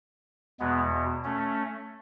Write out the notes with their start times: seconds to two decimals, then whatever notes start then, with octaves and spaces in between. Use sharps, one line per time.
0.60 E2 B2 G#3 B3
1.24 A3 C#4